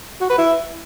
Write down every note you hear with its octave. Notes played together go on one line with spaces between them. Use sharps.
F#4
B4
E4